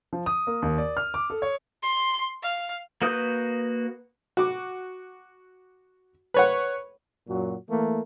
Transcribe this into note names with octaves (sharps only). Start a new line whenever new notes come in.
F3
D#6
A#3
D#2
D5
F6
D6
A4
C#5
C6
F5
A#3 F#4 B4 D#6 G6
F#4 D6
B4 C#5 F#5
F#2 A#2 F#3 F#4
E3 A3 A#3